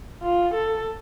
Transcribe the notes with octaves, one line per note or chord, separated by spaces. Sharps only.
F4
A4